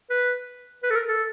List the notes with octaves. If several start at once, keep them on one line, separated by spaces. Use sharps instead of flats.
B4
B4
A4
A#4
A4